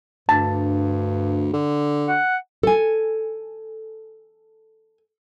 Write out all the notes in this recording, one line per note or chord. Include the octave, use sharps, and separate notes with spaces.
D2 G2 A5
D3
F#5
A4 G#5